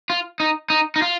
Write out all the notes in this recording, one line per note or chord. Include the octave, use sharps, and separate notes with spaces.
F4
D#4
D#4
D#4
F4